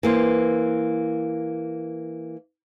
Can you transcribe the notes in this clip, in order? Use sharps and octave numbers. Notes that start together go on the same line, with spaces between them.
E3 A#3 C5